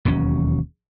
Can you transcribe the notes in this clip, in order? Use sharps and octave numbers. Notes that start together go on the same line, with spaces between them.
E1 D#2 F#3 C#4